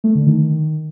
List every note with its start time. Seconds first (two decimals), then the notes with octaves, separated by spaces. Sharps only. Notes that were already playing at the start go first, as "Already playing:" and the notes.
0.04 A3
0.15 D3
0.27 D#3